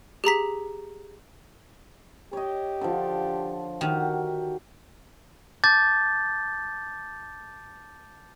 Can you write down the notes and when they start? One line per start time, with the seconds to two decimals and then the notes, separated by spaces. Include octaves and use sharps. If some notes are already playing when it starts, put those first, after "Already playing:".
0.24 G4 G#4 A#5 B6
2.33 G4 C#5 D#5
2.81 D3 F3
3.81 D#3 F#4 G4 F#5
5.64 A5 D6 G6 A6